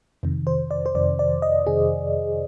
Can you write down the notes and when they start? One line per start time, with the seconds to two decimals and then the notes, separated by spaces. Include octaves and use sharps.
0.23 F2 C3 D#3
0.47 C5
0.71 D5
0.86 C5
0.94 F2 C3 D#3 D5
1.19 D5
1.42 D#5
1.67 F2 C3 D#3 G#4